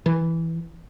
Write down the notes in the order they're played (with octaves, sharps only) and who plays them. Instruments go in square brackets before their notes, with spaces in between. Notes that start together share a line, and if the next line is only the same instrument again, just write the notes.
[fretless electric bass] E3